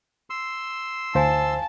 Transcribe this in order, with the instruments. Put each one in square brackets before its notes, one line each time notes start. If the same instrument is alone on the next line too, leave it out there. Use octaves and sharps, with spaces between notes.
[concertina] C6 E6
[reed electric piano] D2 C5 [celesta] F5 G#5 [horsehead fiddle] A5